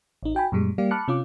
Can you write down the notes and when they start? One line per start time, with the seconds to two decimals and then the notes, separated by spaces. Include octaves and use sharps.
0.23 A1 D#4
0.35 F#4 G5 G#5 B5
0.52 F#2 A#2 G3 G#3
0.78 G3 A#3 G4 D5 F5
0.91 A5 B5 D6 F6 F#6 C#7
1.08 C3 C#4 F4 F5 D6